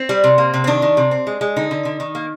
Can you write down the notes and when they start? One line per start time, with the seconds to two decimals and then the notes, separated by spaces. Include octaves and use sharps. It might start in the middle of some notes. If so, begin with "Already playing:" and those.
Already playing: C4
0.09 G3
0.24 C3
0.38 A#3
0.54 C3
0.64 C4
0.67 D#3 D4
0.82 D#3
0.97 C3
1.11 C4
1.27 G#3
1.41 G#3
1.56 D3 D#4
1.71 D3
1.85 D3
2.00 D#3
2.15 A#3